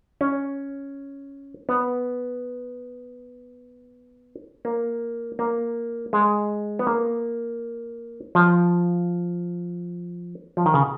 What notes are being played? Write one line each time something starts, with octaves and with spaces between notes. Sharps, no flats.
C#4
B3
A#3
A#3
G#3
B3
A#3
F3
F3
D#3
C#3